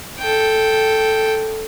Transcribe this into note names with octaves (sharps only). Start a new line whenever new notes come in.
A4 G5